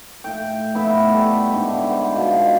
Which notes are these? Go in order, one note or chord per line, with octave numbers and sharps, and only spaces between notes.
A2 G5
A2 B3 E4 E5
G3 A3
G#2 D3
C5
B2 F4